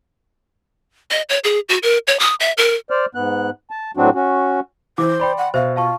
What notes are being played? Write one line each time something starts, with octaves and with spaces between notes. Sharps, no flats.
D#5
C#5
G#4
F#4
A#4
C#5
D#6
E5
A#4
C5 D5 F6
G#2 B3 F#6
A5
A2 F#3 C4 D4 F#4
C#4 F#4
E3 C5 D6
D5 G5 B5 C6
F#5
B2 C5 E5 F5
F4 F5 A5 C#6